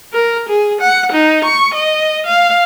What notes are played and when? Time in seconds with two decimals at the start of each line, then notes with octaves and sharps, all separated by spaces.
0.13 A#4
0.49 G#4
0.81 F#5
1.12 D#4
1.44 C#6
1.74 D#5
2.26 F5